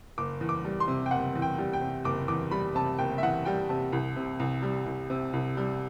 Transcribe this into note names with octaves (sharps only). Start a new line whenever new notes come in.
F#1 D6
E2
D6
G3
C6
C3
G5
F#1 F#5
E2
G5
G3
G5
C3
F#1 D6
E2 D6
G3 B5
C3 A5
F#1 G5
E5
E2 F#5
G3 G5
C3 A5
C2
C3
C2
G3
C2
C3
C2
G3